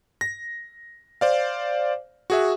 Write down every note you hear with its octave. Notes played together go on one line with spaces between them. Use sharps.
A#6
C5 D5 F5
F#4 G#4 E5